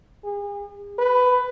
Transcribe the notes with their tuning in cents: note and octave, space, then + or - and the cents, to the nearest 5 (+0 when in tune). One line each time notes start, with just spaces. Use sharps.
G#4 -40
B4 +15